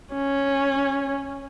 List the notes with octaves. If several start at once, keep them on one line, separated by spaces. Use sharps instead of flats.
C#4